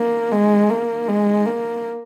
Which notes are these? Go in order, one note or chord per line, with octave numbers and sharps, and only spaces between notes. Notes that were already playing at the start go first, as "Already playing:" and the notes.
Already playing: A#3
G#3
A#3
G#3
A#3